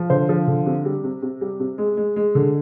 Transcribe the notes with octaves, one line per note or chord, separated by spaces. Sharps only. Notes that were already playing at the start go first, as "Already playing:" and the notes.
Already playing: F3
D3 C5
F3
D3
C3
G3
C3
C3
G3
C3
G#3
G#3
G#3
D3